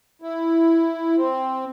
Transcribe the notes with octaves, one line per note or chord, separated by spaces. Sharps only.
E4
C4